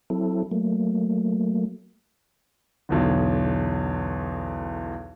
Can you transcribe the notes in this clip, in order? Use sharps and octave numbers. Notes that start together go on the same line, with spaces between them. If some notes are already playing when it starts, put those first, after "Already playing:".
F#3 C4 E4 A4
F#3 A3 A#3
B1 E2 D3